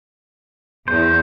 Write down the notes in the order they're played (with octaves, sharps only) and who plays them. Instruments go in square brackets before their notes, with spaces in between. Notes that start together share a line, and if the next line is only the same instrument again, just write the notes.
[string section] E2 [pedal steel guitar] C5